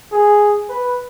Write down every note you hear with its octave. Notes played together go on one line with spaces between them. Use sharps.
G#4
B4